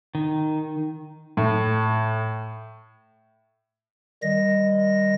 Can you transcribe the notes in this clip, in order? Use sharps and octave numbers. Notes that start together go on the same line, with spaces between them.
D#3
A2
D#3 G3 D#5 A#6